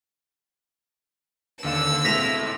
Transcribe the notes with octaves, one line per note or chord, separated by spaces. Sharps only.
D#2 D3 F5 E6 E7
B2 G#3 A3 C4 E4 A#6 B6 F7